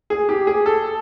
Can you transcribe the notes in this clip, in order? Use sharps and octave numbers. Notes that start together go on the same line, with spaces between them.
G#4
G4
G#4
A4